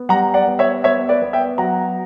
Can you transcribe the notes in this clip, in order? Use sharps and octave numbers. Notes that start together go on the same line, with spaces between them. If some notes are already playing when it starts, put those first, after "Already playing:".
Already playing: B3
G3 F#5 A#5
D5 F#5
B3
C#5 E5
B3 C#5 E5
B4 D5
B3
E5 G5
F#3 F#5 A#5